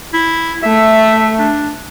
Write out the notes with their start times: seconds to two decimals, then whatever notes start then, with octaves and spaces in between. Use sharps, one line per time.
0.13 E4
0.63 A3 E5
1.39 D4